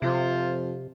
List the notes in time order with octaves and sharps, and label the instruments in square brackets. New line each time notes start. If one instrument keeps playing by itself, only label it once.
[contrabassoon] F2 [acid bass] C3 [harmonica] F4 C5